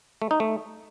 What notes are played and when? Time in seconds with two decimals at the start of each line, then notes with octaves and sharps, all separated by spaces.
0.22 A3
0.31 D#4
0.40 A3